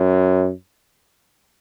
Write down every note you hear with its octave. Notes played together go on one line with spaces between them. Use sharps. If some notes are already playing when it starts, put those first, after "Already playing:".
Already playing: F#2